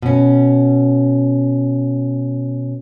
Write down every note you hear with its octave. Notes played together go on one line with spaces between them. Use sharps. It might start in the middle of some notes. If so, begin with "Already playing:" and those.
B2 C#4